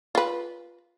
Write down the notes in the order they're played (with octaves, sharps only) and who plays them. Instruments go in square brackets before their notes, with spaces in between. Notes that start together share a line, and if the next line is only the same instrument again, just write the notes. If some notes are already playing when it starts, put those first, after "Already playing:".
[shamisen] F4 B4